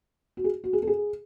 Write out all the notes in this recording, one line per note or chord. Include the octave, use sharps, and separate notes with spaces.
F#4
G#4
F#4
G#4
A4
G#4